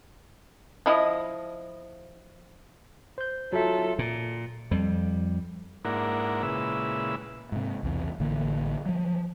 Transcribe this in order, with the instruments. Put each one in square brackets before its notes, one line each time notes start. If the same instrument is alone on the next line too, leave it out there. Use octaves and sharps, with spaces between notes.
[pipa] F3 E4 D#5
[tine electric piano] C5 G6
[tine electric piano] F#3 E5 [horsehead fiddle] F4 A4
[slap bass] A#2
F2 G3
[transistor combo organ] G#2 A#3 D4 E4 A#4 F#5
A#2 C#3 G#3 E4 B4 E6
[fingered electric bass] G#2 C3
B1 E2 C3
A1 D3 E3 A#3
F3 F#3